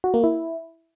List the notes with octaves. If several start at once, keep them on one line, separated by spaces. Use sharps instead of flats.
F#4
A#3
E4